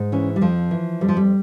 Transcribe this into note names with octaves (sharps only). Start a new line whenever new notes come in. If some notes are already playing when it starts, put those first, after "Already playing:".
Already playing: G#2
E3 C#4
G3
F2 F3
E3
F2 G3
F3
G3